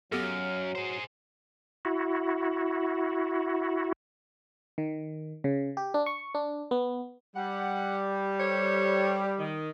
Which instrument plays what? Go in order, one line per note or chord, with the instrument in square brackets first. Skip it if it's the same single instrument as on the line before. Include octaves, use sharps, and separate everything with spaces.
[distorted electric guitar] F#2 [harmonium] F#3 [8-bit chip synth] B3 G4 A4 [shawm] F5
[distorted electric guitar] G#4 C5
[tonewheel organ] E4 F#4
[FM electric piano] D#3
C#3
G4
D4
C#6
D4
B3
[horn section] G3 [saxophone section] F#5
[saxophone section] A4 C5 C#5
D#3